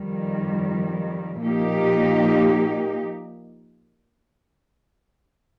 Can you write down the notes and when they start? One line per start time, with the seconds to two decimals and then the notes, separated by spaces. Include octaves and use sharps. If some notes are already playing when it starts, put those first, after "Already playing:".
Already playing: F2 D#3 G3
1.42 A#2 F3 A#3 D#4 G4